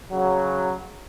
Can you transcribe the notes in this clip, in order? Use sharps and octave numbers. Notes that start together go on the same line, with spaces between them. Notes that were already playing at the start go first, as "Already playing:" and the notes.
C#3 F#3